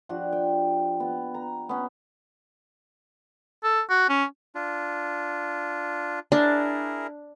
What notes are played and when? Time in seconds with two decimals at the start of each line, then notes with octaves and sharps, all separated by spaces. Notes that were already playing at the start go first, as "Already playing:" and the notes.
0.09 F3 D4 F#4 G4
0.32 G5
1.00 B3
1.34 A#5
1.69 B3 C#4
3.64 A4
3.90 F#4
4.09 C#4
4.55 D4 F4
6.32 D4 E4 G#4 A#4